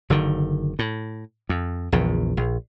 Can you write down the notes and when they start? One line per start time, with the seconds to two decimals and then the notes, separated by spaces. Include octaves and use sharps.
0.10 F#1 D3 D#3
0.79 A2
1.49 F2
1.92 A#1 E2 C#3
2.37 A#1